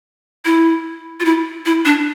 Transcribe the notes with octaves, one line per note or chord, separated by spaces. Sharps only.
E4
F4
E4
E4
D4